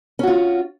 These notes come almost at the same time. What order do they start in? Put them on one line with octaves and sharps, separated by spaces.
C#4 F#4 F4